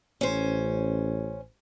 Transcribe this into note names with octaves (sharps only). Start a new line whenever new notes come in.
A1 C#4 C5